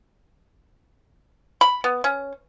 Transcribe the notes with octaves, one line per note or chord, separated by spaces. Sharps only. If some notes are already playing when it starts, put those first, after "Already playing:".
B5
B3
C#4